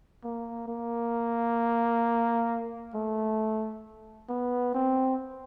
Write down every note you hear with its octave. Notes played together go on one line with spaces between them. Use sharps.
A#3
A#3
A3
B3
C4